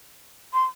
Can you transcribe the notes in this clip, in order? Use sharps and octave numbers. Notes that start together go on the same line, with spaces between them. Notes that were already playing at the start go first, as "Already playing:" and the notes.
C6